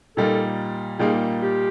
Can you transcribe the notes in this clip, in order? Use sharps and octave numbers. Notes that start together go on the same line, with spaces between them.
A#2 G3 A#3 D#4 A4
A#2 G3 A#3 D#4 G#4
G4